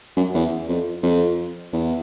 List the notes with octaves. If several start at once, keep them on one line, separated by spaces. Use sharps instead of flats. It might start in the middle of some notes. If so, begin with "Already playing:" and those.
F#2
E2
F2
F2
E2